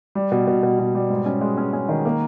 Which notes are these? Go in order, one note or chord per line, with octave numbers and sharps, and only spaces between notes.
G3
B2
B2
B2
B2
G3
G#2
C#4
G#3
C#4
C#4
D#3
A#3